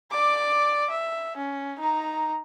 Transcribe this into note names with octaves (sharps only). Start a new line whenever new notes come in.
D5 D6
E5
C#4
D#4 A#5